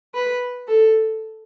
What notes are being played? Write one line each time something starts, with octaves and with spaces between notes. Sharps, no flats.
B4
A4